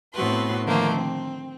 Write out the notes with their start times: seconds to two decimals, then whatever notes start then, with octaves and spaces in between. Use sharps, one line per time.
0.14 A2 B3 C4 F#4 B4 C6
0.66 D3 D#3 F3 A3 A#3 C5
0.94 C4